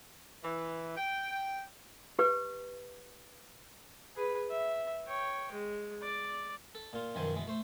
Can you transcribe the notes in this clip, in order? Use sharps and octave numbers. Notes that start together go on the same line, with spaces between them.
E3
G5
G4 B4
G#4 B4
E5
C#5 G5
G#3
D5
A4
A#2 F4
F#2 B2 D#3 F3 C5 G#5
B2 E3 G#3
A3 C5